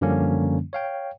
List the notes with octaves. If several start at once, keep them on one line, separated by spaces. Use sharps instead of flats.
F#2 D3 F3 G3 A#3 C#4
C#5 F5 G5